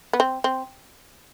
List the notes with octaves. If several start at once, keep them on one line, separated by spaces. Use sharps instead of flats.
B3
C4
C4